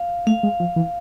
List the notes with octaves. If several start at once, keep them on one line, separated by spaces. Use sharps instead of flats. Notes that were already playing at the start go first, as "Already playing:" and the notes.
Already playing: F5
A3 F5
G#3
F3
E3